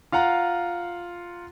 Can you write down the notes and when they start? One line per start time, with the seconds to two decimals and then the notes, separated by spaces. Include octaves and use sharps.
0.12 F4 F5 F#5 A#5